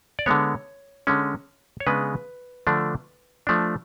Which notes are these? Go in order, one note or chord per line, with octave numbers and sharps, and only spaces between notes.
D5
D3 G#3 B3 C#5
D3 G#3 C#4
C#5
C#3 G#3 B3 D4 B4
D3 F3 A3 D4
F3 A3 D4